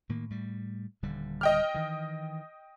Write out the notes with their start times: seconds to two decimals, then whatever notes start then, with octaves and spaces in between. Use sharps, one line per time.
0.09 A2 D#3 A#3
0.30 A2 G3
1.02 D#1 D3 G3
1.41 D#5 G5 F6
1.74 D#3 E3